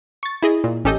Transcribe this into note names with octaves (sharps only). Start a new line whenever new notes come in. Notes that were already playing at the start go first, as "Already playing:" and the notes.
C#6 A6
E4 G#4 D#5
A#2
A1 C#4 G4 A4 D#5 G6